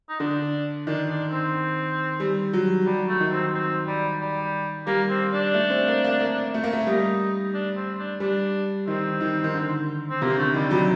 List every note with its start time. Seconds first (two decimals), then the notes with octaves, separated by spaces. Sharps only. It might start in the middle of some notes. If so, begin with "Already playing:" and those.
0.09 D#4
0.19 D3 D4
0.87 D#3 D4
1.09 D4
1.31 C4
2.20 G3
2.53 F#3
2.86 F#3 G3
3.09 A3
3.20 D#3
3.31 C4
3.54 C4
3.87 G3
4.20 G3
4.87 G3 A#3
5.09 C4
5.32 D4
5.54 A3
5.70 C4
5.87 A#3
6.04 A#3
6.21 A#3
6.54 A3
6.64 A#3
6.73 A3
6.87 G3 D#4
7.54 D4
7.76 C4
7.99 D4
8.20 G3 D4
8.87 D#3 C4
9.21 D#3
9.44 D#3
9.54 D3
10.10 C4
10.22 C3 A#3
10.38 D3 A3
10.54 D#3 G3
10.71 F#3 G3